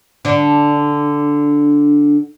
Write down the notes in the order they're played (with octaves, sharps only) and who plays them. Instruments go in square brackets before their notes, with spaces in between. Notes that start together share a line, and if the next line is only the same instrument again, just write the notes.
[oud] D3 D4